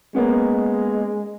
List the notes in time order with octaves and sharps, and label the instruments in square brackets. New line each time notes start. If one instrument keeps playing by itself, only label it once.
[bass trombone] G#3 [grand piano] A#3 B3 C#4